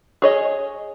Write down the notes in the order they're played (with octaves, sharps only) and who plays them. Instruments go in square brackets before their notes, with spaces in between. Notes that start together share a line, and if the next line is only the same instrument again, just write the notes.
[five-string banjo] G#4 C#5 D#5